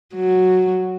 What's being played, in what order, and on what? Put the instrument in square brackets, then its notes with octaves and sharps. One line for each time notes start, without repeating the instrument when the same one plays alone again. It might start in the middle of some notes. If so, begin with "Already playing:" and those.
[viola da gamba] F#3